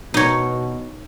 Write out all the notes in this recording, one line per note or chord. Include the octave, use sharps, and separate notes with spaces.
B2 D#4 C#5